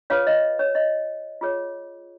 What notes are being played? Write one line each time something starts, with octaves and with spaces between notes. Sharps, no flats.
F4 G#4 B4 C#5 F5
D#5
C#5
D#5
F4 G#4 C#5